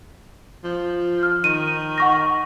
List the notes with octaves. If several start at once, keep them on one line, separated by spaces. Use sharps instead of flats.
F3
F6
D#3 D#7
F#5 C#6 A#6